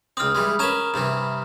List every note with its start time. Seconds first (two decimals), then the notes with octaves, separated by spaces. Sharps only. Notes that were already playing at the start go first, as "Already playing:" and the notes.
0.17 C#2 C4 D#6 F6
0.35 E3 G3 G#3
0.59 C#4 A#4 B4 A#5 G#6 E7
0.94 G2 C3 E3